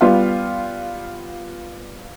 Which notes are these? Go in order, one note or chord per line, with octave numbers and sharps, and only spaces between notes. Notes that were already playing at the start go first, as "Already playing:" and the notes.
G3 B3 F4 F5